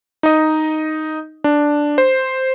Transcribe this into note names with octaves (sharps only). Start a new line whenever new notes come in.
D#4 D#5
D4
C5